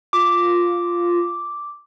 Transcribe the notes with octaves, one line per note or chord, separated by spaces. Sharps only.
F4 D6